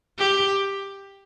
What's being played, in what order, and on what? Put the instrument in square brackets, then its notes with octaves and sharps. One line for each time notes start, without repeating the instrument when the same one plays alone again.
[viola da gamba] G4